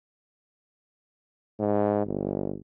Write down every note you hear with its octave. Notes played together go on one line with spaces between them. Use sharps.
G#2
G1